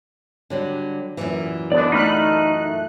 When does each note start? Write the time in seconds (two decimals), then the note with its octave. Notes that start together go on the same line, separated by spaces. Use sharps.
0.50 D3 F#3 G3
1.17 F#2 A#2 E3
1.72 D3 B3 D4 D5
1.92 A3 D#4 B5 F6 F#6